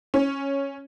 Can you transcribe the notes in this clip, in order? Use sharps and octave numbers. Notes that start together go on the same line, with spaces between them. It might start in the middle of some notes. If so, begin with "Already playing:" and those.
C#4